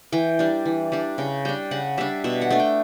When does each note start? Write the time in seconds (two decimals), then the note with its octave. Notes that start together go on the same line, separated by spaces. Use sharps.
0.12 E3 G5
0.39 G3 D4
0.66 E3
0.92 G3 D4
1.18 C#3 G5
1.45 G3 D4 G5
1.71 C#3 F#5
1.98 G3 D4 E5
2.24 B2 E5
2.42 F#5
2.51 A3 D4
2.60 G5